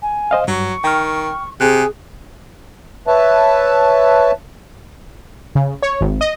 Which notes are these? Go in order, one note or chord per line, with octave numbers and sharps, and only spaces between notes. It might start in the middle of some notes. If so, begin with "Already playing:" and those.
G#5
C5 D#5 F5
G2 F#3 C#6
D#3 G5 F6
C3 G#4 G#5 F#6
B4 C#5 E5 A5
C#3
C#5
G#1
D#5